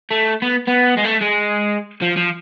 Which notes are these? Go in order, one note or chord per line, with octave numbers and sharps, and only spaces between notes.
A3
B3
B3
G#3
A3
G#3
F3
F3